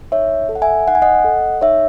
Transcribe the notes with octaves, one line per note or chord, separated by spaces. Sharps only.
D#4 C#5 E5
A4
F#5
E5 G#5
D#4 F#5
G#5
D#5 F#5
A4
D#4 C#5 E5